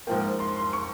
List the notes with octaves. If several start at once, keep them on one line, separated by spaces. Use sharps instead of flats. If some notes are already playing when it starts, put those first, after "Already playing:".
G#2 F3 A#3 G5
C6
C6
C#6